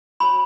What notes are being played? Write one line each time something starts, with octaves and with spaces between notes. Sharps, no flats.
F#4 C#5 B5